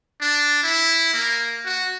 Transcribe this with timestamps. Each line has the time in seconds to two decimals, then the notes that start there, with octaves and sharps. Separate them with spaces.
0.21 D4
0.63 E4
1.13 A#3
1.66 F#4